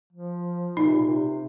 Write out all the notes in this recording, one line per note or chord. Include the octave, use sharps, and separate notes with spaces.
F3
A#2 D#4
C3
A#2
C3